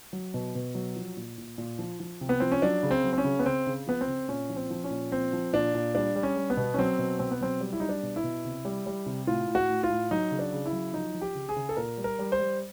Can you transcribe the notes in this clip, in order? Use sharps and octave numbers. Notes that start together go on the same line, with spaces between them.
F#3
B2
B2
F#3
F3
A#2
A#2
A#2
F3
F3
C3
B3
F3 C4
C#4
F#3 D4
C#3
C4
F#3
C4
C#4
C#3
B3
C#3 C4
C#3
F3 B3
C4
C#3
A#2 C#4
F3
C4
F3
C#4
A#2
F3 C4
F3
A#2 D4
A#2
G3 D4
G3
C#4
G3
B3
B2
C#4
F#3 C4
B2
B2 C4
B3
F#3 C4
G3
E4
G3 D#4
D4
B2
E4
B2
C3
G3
G3
C3
A2 F4
A2
F#4
A2
F4
A2
F#3 D#4
C#3
D4
C#3
E4
F#3
F3 D#4
F3
G4
C#3
G#4
C#3
A4
A#2 A#4
G3
A#4
G3
C5
G3